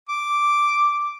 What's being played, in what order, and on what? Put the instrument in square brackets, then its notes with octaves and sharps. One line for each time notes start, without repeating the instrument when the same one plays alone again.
[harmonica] D6